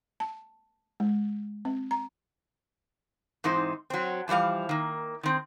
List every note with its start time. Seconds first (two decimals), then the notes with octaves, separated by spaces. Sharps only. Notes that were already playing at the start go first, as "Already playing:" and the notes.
0.20 A5
1.00 G#3
1.65 C4
1.91 A#5
3.44 G#2 E3 C4 D#4 C5
3.90 F#3 C4
4.28 F2 E3 F3 G3 F5
4.69 D#3 A#3
5.23 D#3 C4